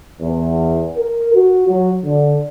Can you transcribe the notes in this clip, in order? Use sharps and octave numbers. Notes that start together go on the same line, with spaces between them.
E2
A#4
F#4
F#3
D3